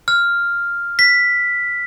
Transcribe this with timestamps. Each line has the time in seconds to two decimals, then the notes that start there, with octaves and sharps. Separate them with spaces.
0.08 F6
0.99 B6